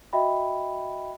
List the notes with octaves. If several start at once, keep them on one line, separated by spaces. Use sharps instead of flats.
F#4 D#5 E5 G5 B5